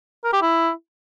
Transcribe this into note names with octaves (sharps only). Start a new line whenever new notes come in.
A#4
G4
E4